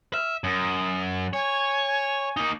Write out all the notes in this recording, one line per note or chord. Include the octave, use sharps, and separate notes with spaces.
E5 F6
F#2 D#6
C#5 G#5
A#3 D#4